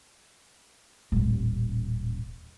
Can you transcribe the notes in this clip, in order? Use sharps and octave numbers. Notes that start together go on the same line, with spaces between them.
D#1 A1